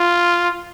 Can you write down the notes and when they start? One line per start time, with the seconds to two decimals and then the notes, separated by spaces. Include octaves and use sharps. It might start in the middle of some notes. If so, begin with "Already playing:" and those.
Already playing: F4